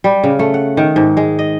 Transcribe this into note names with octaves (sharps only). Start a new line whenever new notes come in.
G3
C#3
A3
F#5
D#3
G#2
G#3
D#5